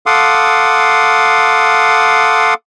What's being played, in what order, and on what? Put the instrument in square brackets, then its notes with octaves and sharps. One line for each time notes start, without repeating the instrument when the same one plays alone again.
[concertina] A4 F5 F#5 C6 D6 D#6